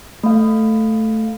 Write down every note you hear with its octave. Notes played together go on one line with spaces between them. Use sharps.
A3 F5